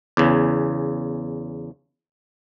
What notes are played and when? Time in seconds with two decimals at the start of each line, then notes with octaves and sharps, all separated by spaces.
0.17 E2 C#3